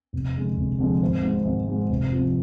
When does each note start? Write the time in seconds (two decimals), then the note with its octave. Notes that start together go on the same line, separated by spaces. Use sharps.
0.13 F1
0.35 F2 D3 G#3
0.57 F1
0.79 F2 D3 G#3
1.02 G#1
1.23 G#2 G#3
1.45 G#1
1.68 G#2 G#3
1.89 F1
2.12 F2 F3